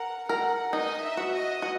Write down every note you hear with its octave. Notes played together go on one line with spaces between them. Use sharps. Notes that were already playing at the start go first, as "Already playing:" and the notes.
Already playing: A#4 F#5
A#4 F#5
D#4 D#5
E5
F#4
D#5
F#4